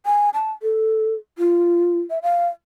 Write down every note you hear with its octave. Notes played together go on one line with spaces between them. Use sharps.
G#5
A5
A4
F4
E5
F5